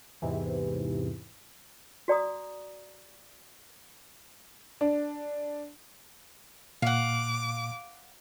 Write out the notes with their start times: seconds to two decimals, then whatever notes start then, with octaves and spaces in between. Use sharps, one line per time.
0.22 E2 G#2 C3 E3
2.08 F#4 D5 A#5 D#6
4.81 D4
6.82 A#2 F5 F#5 D6